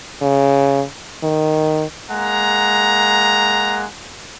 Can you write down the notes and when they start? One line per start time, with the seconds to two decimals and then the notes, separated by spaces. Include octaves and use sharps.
0.22 C#3
1.23 D#3
2.10 G#3 A#3 F#5 A#5